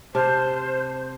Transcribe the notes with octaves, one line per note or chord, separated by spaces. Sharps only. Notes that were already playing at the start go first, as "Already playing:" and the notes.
C3 C5 A5 F6